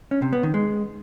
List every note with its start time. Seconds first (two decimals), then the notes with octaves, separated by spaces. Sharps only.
0.11 C#4
0.22 C3
0.33 B3
0.43 D#3
0.54 G#3